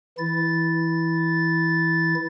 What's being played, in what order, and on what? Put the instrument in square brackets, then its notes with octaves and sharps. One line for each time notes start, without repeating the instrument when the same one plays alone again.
[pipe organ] E3 E4 A6